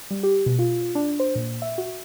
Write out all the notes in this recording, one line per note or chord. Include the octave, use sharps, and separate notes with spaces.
G3
G4
B2
F4
D4
C5
A#2
E5
F#4